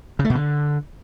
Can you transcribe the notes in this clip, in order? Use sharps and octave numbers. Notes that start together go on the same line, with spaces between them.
C#3
A3
B2
D3